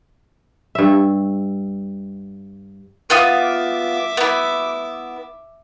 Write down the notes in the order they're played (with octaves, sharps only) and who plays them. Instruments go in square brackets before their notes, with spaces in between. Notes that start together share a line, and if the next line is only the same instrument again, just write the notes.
[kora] G2 E5
[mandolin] B3 F4 D#6 [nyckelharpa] E5 D6
[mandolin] B3 E4